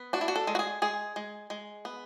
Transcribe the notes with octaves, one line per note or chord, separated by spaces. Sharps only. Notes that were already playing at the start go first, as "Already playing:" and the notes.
Already playing: B3
D4 F#4
E4
F#4
A4
G#3
F#4
G#4
G#3 G#4
G#3
G#3
B3